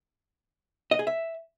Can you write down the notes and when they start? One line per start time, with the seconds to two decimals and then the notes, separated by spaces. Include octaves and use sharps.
0.91 D#5
0.99 G#4
1.07 E5